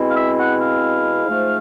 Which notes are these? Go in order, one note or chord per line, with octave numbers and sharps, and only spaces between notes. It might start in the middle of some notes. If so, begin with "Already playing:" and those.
Already playing: B2 G#3 C4 E4
F5
E5
F#5
F5
G#2 F3 A3